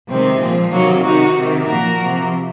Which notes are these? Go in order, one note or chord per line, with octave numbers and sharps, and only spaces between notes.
C3 D#3 G#3 C4
A#2 F3
C3 D#3 F#3 A#3
C3 D#3 D#4 F#4
C3 D#3
A#2 F3 F#4 A#4
C3 F3